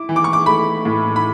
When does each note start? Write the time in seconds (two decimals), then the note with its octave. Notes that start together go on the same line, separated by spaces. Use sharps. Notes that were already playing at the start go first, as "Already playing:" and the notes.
Already playing: E4 D6
0.09 E3
0.16 D6
0.24 C#6
0.33 D6
0.46 A3 B5
0.85 A2
1.16 B5